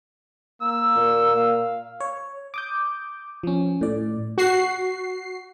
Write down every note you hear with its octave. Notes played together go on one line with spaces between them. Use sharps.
A#3 E6
A#2
F5
C#5
D6 D#6 G6
F3 C#4
A2 D5
F#4 C7